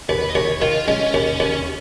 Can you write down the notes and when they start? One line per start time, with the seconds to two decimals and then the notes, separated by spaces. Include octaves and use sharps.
0.09 D#2 B4
0.30 D#5
0.35 D#2 C#5
0.61 D#3 F4
0.88 G#3 C#4
1.14 D#2
1.40 D#2